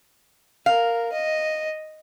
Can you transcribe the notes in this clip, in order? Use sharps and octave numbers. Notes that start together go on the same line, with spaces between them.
A#4 F5
D#5